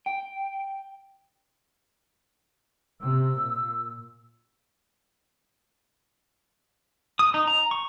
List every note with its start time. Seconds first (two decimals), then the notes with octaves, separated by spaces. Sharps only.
0.06 G5
3.01 C3 E6
3.38 A#2
7.19 D#6
7.34 D#4
7.47 A#5
7.71 C#6